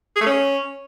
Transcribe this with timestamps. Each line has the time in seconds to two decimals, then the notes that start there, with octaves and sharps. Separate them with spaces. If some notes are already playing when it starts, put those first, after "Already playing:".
0.16 G#4
0.21 A3
0.26 C#4